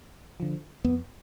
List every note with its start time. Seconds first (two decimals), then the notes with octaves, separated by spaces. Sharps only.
0.40 D3 F3
0.85 F2 B3